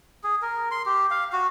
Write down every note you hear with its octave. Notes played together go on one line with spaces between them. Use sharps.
G#4
A#4
C6
G4
F5
F#4